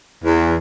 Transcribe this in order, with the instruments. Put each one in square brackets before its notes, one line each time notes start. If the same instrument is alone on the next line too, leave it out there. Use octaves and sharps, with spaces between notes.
[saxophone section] E2